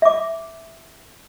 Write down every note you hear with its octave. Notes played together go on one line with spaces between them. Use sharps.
E5 D6